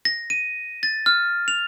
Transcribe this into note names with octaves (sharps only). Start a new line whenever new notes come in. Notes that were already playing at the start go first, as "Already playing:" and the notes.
A#6
D#7
A6
F6
F7